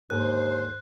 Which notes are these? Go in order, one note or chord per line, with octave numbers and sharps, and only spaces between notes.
D#2 G#2 D3 A#3 C5 F#6